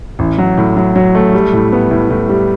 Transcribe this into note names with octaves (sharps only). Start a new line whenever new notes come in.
A1
F#3
A2
F#3
F#3
A3
G3
A2
B3
A2
A2
G3